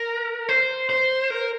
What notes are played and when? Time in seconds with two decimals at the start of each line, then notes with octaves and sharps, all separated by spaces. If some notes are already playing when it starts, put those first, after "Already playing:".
Already playing: A#4
0.49 C5
0.90 C5
1.30 A#4